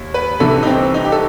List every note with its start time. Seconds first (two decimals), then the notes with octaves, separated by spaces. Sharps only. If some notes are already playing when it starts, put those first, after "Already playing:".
Already playing: D#2
0.14 B4
0.40 C2 C3 E3 A4
0.63 D#4
0.67 C4
0.94 D#4
1.05 G4
1.12 A4